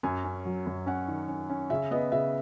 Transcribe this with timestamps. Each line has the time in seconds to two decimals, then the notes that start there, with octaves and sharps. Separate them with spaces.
0.03 F#2 G#5
0.24 C#4
0.45 F#3
0.66 F#2
0.86 C#4 F#5
1.08 D#3
1.28 C#4
1.50 C#4
1.70 C#3 E5
1.91 B3 D#5
2.12 C#3 E5